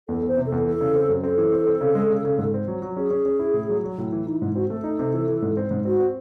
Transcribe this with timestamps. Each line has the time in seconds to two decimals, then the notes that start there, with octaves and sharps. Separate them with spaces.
0.08 E2 A4
0.22 E2
0.28 C5
0.37 C3
0.46 A4
0.52 E2
0.65 E3 A4
0.81 C#3
0.95 C4
1.09 F#2
1.23 C4 A4
1.38 E3
1.52 C4
1.67 C4
1.81 C#3
1.95 G#3
2.10 C#3
2.25 C#3
2.38 G#2
2.54 C4
2.68 F#3
2.82 F#3
2.97 C#4 G#4
3.11 C#4
3.25 C#4
3.39 E4
3.54 A2
3.69 F#3
3.84 F#3
3.98 A2
4.12 E3 E4
4.26 E3 D#4
4.41 G#2 E4
4.55 C4 F#4
4.70 A3 A4
4.84 D#4
4.99 C3
5.14 E3
5.28 E3
5.42 G#2
5.57 C4
5.71 G#2
5.85 C4 F#4
6.00 C4